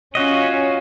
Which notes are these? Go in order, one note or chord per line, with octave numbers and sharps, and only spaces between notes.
C#4 F4 F#4 D#5